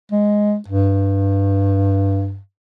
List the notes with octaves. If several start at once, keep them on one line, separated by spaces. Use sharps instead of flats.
G#3
G2